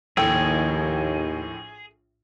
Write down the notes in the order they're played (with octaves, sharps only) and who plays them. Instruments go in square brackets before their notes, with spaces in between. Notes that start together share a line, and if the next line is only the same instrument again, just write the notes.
[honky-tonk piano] A#1 A2 [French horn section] D#2 [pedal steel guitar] G#4 [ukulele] A4 G5